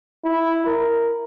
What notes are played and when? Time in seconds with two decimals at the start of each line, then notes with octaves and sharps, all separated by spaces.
0.25 E4
0.66 A#4